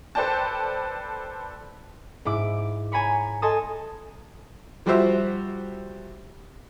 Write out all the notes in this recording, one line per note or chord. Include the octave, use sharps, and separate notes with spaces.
A4 B4 C5 D5 G5 A5
G#2 E4 D6 D7
C#5 G#5 A#5 B5 C#6
A4 D#5 G#5 A5 C6 D#6
F3 G3 F#4 G4 C5 E5